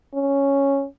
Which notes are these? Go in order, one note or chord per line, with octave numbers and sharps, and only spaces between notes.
C#4